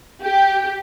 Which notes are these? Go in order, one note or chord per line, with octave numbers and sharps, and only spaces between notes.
G4